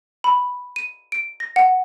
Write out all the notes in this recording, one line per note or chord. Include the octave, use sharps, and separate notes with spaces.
B5
D#7
D7
A#6
F#5